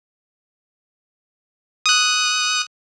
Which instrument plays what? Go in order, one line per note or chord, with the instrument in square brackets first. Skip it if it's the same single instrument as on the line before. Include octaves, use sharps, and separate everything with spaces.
[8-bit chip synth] D#6 F#6